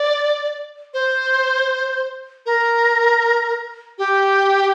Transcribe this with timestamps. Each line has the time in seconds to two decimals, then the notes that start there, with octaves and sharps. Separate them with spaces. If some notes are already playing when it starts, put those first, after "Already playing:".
Already playing: D5
0.94 C5
2.46 A#4
3.98 G4